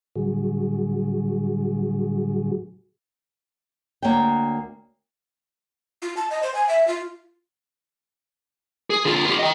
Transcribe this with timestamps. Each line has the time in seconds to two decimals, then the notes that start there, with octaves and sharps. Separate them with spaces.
0.16 A2 D3 F#3 G3 F#4 G#4
4.02 D2 A#3 C#5 F#5 G5
6.02 F4
6.17 A5
6.30 D#5
6.43 C5
6.55 G#5
6.69 E5
6.88 F4
8.90 G#4
9.05 D3 F4
9.27 F4 G4
9.39 D#5 G5